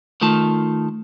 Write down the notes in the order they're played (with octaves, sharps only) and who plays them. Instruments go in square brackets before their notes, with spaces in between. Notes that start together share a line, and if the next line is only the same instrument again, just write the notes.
[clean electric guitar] D#3 A3 F4 A5